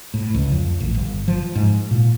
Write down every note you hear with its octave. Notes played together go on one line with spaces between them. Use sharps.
A2
C#2
F2
A1
G1
F3
G#2
A#2